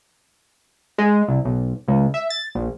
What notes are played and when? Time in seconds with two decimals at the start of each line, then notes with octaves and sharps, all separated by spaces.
0.98 G#3
1.28 C2
1.45 B1
1.88 C#2
2.14 E5
2.30 A6
2.55 A#1